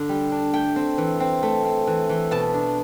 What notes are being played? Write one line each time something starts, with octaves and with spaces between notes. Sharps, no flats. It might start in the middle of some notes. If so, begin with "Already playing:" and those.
Already playing: D3 D4
G3
D4
A3 G5
C4
E3
C4
A3
C4
E3
E3
B2 A5
D4